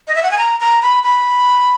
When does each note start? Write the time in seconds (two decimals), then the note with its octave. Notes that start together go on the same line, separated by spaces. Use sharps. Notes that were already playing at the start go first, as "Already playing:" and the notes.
0.08 D#5
0.15 E5
0.23 F#5
0.31 G#5
0.38 A#5
0.60 A#5
0.82 B5
1.04 B5